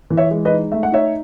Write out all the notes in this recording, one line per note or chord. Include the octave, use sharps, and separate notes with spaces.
E3
C#5 E5
G#3
B4 D#5
D#4
A3 E5
F#5
D#4 C#5 E5